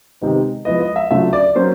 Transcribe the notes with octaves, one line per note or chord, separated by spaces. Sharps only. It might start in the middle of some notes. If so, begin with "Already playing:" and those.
C3 D#3 G#3 B3 D#4
F3 G#3 B3 E4 D#5
D#5
E5
C#3 F#3 A3 D4 F4 E5
D5
F#3 A#3 C#4 C5